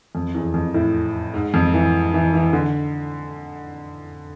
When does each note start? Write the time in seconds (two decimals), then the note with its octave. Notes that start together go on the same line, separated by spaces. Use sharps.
0.15 F2
0.34 E2
0.54 F2
0.74 A2
1.34 G#2
1.54 F2
1.74 E3
2.14 E3
2.33 E3
2.53 D3